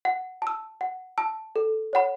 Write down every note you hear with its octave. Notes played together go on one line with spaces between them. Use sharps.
F#5
A5 E6
F#5
A5 E6
A4
C#5 F#5 B5